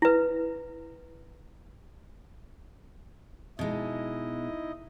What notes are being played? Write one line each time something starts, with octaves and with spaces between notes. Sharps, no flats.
E4 B4
B2 G#3 D#4 E4 D#5